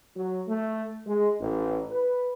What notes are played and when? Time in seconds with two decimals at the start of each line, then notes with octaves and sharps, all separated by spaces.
0.16 F#3
0.48 A3
1.06 G#3
1.41 A1
1.91 B4